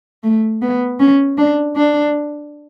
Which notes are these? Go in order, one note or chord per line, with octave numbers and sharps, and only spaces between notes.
A3
B3
C#4
D4
D4